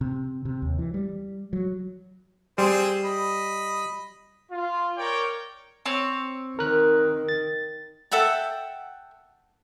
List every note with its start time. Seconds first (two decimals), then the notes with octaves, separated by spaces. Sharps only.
0.01 C3
0.45 C3
0.62 D#2
0.79 E3
0.94 G3
1.53 F#3
2.58 G3 C4 G#4 C5
3.05 D#5 B5
4.50 F4
4.96 A#4 C#5 D5 G5
5.86 C4 C#5
6.59 D#3 A#4 F#6
7.29 A6
8.11 A4 E5 F#5 G5